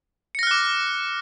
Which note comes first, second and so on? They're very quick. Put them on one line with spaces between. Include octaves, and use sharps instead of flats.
C#7 A#6 F6 F#6 D6